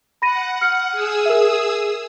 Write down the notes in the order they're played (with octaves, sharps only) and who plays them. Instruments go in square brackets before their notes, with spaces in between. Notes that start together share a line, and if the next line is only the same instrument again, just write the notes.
[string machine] F#5 [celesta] B5 A#6 D#7
[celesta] F6 C#7
[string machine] G#4 D#6 E6
[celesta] A#4 E5